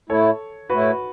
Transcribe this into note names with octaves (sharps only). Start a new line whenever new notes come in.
A2 A3 E4 A4 C#5
A2 A3 E4 F#4 B4